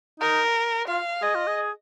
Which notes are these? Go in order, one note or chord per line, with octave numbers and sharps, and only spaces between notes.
D#4 A#4
F4 F5
G#4 D#5
F4
G#4